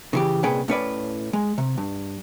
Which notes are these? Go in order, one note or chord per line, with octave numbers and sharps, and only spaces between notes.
C#3 E3 G4
C2 A#2 C#4 G#4 B4 G5
A2 C#4 B4 D5
G#3
C3
G2